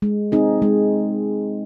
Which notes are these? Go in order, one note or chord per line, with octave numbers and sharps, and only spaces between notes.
G#3
C4 D#4 G#4
G#3